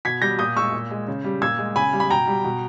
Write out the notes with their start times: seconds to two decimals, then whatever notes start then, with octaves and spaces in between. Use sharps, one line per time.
0.05 B2 G#6 B6
0.22 G3 G6 A#6
0.39 A#2 D#6 G6
0.56 G#3 C#6 E6
0.73 A#2
0.91 G#3
1.08 C#3
1.25 G3
1.42 A#2 E6 G#6
1.59 G#3
1.76 C#3 G#5 B5
1.93 G3
2.00 B5
2.10 B2 G5 A#5
2.28 G3
2.44 B2